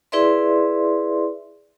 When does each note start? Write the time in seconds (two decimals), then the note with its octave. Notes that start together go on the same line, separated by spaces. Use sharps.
0.12 E4 G#4 B4 D5 E5 C6